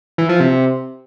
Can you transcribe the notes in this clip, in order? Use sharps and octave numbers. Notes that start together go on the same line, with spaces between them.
E3
F3
C3